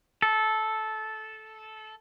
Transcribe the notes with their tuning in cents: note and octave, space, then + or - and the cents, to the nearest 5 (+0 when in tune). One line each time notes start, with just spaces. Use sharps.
A4 -10